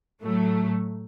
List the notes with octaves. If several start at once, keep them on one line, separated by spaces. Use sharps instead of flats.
A2 F#3 A3